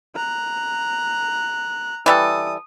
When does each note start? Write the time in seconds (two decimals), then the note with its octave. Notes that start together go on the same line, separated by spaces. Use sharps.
0.16 A#5 F#6
2.06 E3 G3 A4 D#6